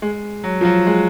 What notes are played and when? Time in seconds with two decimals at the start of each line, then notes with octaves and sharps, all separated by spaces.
0.02 G#3
0.44 F#3
0.61 F3
0.65 F#3
0.87 G#3